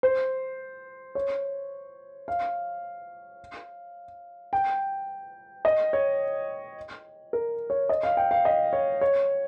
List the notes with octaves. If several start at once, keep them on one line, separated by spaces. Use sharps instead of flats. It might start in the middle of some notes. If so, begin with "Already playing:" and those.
C5
C#5
F5
G5
D#5
C#5
A#4
C#5
D#5
F5
G5
F5
D#5
C#5
C#5